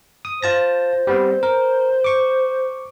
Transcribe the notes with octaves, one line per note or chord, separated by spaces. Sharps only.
D#6
F4 C5 A5 A#6
G3 B3 C4
A#4
C#6 D6